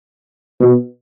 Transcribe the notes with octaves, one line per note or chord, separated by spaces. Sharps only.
B2